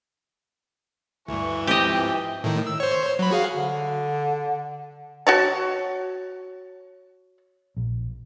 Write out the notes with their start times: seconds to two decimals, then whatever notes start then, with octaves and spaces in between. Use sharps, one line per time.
1.28 D2 G2 E3 C#6
1.67 G#2 F3 C4 G4 D#5 G5
2.44 A2 D#3
2.67 E6
2.80 C5 C#5
3.19 F#3 B5
3.31 F#4 G#4 F5
3.56 D3
5.27 F#4 C#5 A5
7.77 A#1